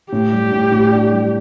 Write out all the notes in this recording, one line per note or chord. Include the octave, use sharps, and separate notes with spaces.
A2 G4
G3
A2
A2
D4
G3